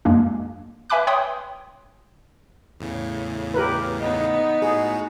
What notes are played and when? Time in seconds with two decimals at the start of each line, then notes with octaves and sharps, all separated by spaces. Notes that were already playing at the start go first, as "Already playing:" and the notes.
0.05 F#2 G#3 A#3 D4
0.90 B4 E5 G#5 B5 D6 F#6
1.07 C#5 G5 B5 C6 D#6
2.80 E2 A2 C#3
3.54 G4 A#4 B4
4.00 B3 D#4 D#5
4.62 A2 F#4 G#4